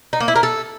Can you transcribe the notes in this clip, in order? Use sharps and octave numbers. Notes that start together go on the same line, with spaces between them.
D#4
A#3
E4
A#4
A4